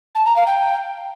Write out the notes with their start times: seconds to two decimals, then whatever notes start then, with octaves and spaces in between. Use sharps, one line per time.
0.15 A5
0.26 A#5
0.36 F5
0.47 G5